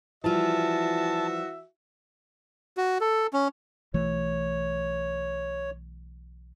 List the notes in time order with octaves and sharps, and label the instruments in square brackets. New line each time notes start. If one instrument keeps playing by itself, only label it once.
[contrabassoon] E3 [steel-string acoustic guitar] F3 G3 F4 [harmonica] F#4 E5 [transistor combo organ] A5
[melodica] F#4
A4
C#4
[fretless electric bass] B1 E3 A3 [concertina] C#5